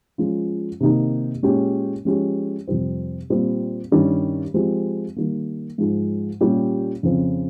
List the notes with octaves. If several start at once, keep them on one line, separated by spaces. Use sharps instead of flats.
F3 G#3 C#4 F4
C3 D#3 A#3 D#4 G4
A#2 G#3 C#4 G4
F3 G#3 C#4 G4
F2 C3 G3 C4
A#2 G3 C4
G2 D#3 G3 C#4
F3 G#3 C4 G4
D#3 G3 A#3
G#2 F3 G#3
A#2 G3 C#4 G4
F2 C#3 F3 C4